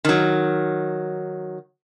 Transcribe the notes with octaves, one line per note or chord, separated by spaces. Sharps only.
D#3 F#3